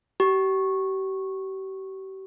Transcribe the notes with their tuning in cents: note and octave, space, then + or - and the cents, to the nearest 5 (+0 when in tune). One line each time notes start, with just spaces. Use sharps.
G4 -35